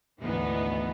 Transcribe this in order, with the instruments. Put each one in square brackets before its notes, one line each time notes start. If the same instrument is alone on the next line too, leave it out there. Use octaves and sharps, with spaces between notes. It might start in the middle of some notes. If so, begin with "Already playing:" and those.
[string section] G#1 D2 E3 B3 D#4